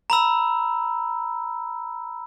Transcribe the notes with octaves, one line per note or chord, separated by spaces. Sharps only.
A#5 B5 E6